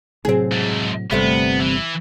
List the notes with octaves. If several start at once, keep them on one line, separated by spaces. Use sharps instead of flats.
A2 C3 F#3 C4 G#4
G#2 A3
G1 C3 G3 A3 B3 C4
E3